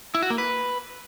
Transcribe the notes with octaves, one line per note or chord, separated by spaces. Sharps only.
E4
F#4
A#3
B4